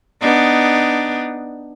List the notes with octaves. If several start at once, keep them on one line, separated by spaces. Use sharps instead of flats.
B3 D4 D#4